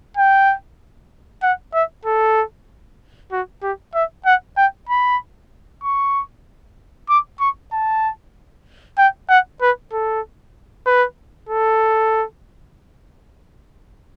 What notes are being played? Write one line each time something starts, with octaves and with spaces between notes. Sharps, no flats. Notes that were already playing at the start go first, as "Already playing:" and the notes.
G5
F#5
E5
A4
F#4
G4
E5
F#5
G5
B5
C#6
D6
C#6
A5
G5
F#5
B4
A4
B4
A4